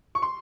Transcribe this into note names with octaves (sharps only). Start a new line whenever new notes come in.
C#6
C6